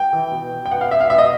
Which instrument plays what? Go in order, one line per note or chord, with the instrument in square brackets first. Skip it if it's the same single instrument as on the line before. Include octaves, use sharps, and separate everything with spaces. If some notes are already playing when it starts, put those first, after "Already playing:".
Already playing: [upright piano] G5
E3
B2
G5
B2 F#5
F5
E5
F5
B2 E5
D#5